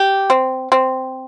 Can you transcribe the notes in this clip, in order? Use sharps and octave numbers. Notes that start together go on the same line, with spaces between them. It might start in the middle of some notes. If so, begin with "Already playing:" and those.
Already playing: G4
C4
C4